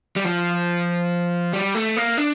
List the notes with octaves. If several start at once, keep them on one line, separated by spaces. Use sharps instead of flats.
G3
F3
G3
A3
A#3
D4